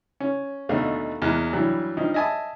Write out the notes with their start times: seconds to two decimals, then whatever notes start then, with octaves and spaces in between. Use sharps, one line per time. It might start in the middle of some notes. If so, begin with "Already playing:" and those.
0.20 C#4
0.69 D#2 B2 D3 A3 F5
1.22 E2 G#3 A#3 F#6
1.53 G2 E3 F#3 G3
1.97 G2 F3 D#4
2.14 D#5 E5 G#5 A5 D#6